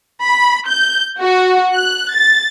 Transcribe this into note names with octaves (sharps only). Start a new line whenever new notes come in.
B5
G6
F#4
F#6
A6